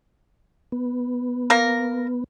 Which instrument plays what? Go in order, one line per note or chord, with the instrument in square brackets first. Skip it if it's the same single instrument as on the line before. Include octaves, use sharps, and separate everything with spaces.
[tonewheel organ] B3
[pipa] A#3 A#4